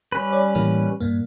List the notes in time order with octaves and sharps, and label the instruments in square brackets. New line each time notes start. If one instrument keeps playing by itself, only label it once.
[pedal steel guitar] G3 C#4 B4
[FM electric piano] C#5 D5
A2 E3 A#3
G2 A#2 A#3